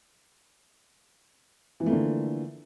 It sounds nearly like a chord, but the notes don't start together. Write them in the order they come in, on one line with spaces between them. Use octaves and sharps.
E3 F3 A3 A#3 D3